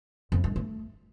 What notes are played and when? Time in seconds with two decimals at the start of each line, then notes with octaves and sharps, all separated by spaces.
0.32 F2
0.44 G2
0.56 A3